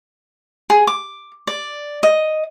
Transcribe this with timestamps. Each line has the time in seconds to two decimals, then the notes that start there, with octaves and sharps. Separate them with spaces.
0.70 G#4
0.87 D6
1.47 D5
2.03 D#5